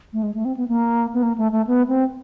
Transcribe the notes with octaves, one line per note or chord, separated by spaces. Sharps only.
A3
G#3
A3
C4
B3
A#3
B3
A#3
A3
A3
B3
C4